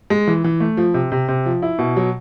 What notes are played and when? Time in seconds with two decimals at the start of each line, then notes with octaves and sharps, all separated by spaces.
0.10 G#3
0.27 E3
0.44 E3
0.60 A3
0.77 F3
0.94 C3
1.12 C3
1.28 C3
1.46 F3
1.62 E4
1.79 B2
1.97 F#3